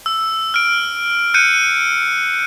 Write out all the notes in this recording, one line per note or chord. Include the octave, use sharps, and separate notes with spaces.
E6
F6 D7
F#6 G6 C#7 D#7